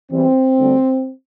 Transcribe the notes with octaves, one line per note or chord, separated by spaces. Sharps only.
E2 E3 G3 C4
D2 D3 G3